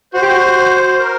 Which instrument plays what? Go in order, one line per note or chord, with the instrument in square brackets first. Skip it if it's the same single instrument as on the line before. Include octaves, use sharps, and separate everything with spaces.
[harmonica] F#4 [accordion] C5
[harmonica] G4
F#4
[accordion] A#4